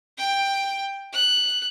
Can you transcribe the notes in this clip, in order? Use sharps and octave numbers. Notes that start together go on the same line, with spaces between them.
G5
F#6